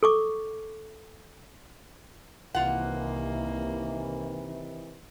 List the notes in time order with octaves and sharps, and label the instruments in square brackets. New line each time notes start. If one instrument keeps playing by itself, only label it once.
[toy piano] A4 C#6 D6
[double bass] C2 A#3 [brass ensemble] C3 D#3 E3 [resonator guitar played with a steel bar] F4 F#5